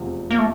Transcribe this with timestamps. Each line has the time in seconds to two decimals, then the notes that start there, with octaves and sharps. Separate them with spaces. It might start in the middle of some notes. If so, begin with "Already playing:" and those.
Already playing: F1 E2 C3 F3 C4
0.30 A#3
0.39 A3